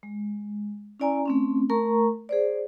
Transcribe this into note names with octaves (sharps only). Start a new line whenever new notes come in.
G#3
C#4 E4 D5 G#5 A#5
A3 C4 C#4
A3 A#4 A#5 C#6
G#4 C5 D5